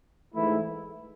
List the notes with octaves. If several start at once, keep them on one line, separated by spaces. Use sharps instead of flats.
G#2 E3 A3 E4